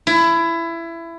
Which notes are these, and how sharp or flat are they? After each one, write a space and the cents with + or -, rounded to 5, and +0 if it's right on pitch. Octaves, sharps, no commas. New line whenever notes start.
E4 +20